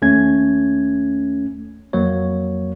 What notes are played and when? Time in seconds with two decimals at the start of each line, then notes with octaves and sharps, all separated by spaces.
0.02 D#2 A3 C#4 G#6
1.93 F2 F#3 A#3 C#5